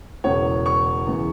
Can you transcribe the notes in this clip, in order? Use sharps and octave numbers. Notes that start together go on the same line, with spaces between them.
E1 E2 C#3 C#5
C#6
E2 C#3 E3